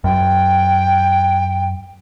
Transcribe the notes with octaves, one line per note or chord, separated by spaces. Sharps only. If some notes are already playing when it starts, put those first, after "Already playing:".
F#2 G5